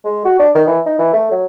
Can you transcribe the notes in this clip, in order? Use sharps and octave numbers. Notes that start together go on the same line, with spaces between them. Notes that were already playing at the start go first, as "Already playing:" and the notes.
G#3
F#4
D4
D#3
E3
D#4
E3
A3
F#3